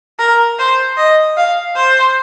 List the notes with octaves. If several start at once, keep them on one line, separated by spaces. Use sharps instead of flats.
A#4
C5
D#5
F5
C5